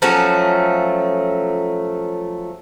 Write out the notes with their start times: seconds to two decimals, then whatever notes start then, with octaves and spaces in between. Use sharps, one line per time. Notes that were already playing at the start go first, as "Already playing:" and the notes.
0.02 F3 F#3 A3 C#4